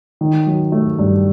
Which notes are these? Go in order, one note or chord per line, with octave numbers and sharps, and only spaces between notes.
D#3
F#3
A3
G2